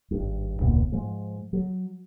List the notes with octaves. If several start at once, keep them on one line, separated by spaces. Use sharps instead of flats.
G#1 G2
E1 C#2 A#2 B3
G#2 F3 G#3
F#3